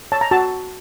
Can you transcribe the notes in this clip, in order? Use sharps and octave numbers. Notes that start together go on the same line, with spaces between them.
C#5 A5
A#5
F#4 A5